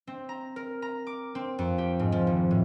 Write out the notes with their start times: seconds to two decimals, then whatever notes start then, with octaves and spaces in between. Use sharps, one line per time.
0.07 C4
0.29 A#5
0.56 A#4
0.82 A#5
1.07 D6
1.35 C4
1.59 F2
1.78 G4
1.99 G#2
2.12 F3
2.27 G#1
2.51 A2